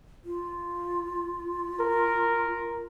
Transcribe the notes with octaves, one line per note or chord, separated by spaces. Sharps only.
F4
A#4